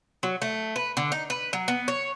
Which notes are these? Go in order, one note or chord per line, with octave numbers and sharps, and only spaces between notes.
F#3
A3
B4
D3
D#4
B4
F#3
B3
C#5